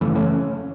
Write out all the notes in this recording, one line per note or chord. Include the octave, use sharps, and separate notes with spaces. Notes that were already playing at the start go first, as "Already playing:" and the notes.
F#2 C#3 E3 A3
A3 C#4